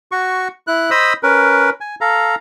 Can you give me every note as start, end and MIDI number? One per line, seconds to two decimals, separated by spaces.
0.12 0.48 66
0.12 0.48 85
0.67 0.90 64
0.67 0.90 90
0.91 1.13 72
0.91 1.13 75
0.91 1.13 83
0.91 1.13 87
0.91 1.13 88
1.23 1.70 61
1.23 1.70 70
1.23 1.70 71
1.81 1.95 80
2.01 2.35 69
2.01 2.35 77
2.01 2.35 82